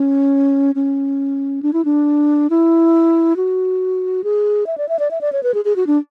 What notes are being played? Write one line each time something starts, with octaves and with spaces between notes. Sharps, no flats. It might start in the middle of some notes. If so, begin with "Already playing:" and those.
Already playing: C#4
C#4
D4
E4
D4
E4
F#4
G#4
E5
D5
E5
D5
E5
D5
C#5
B4
G#4
G#4
F#4
D4